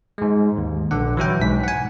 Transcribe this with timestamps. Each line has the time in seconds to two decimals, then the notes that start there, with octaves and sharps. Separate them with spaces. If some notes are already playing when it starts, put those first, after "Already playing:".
0.18 G#2 G#3
0.57 D#2
0.91 A#1 D3 F#5
1.17 E3 F#3 E4 G5
1.40 B1 G#2 B6
1.64 F#5 G#5